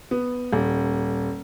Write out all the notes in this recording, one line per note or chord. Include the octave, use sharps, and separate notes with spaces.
B3
D#1